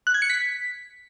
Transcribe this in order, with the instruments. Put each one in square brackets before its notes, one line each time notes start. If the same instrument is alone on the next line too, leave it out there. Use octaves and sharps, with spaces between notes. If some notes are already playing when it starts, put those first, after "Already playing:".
[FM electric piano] F#6
G#6
C#7
B6